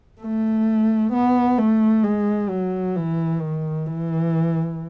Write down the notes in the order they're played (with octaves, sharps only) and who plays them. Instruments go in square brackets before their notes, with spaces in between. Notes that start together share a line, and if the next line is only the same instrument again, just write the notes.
[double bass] A3
B3
A3
G#3
F#3
E3
D#3
E3